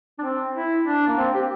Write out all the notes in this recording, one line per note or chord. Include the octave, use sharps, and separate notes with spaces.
D4
C4
E4
D4
A#3
C4
G4